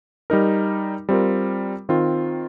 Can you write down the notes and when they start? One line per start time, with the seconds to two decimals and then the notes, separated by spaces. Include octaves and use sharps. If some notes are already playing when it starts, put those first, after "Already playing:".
0.30 G3 D#4 A#4
1.09 G3 C4 F4 A#4
1.89 D#3 C4 F4